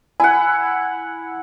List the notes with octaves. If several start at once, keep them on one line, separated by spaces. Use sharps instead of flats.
E4 F#5 G#5